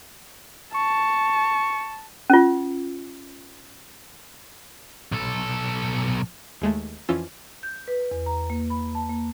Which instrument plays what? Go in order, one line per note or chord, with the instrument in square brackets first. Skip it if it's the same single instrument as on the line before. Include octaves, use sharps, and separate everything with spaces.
[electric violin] A5 [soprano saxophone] C#6
[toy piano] C#4 F4
[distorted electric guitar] B1 A4
[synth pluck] D#2 G#3 A3
F2 E3 C#4 F4 E6
[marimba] G6
B4
E2
A#5
A#3
B5
A5
A#3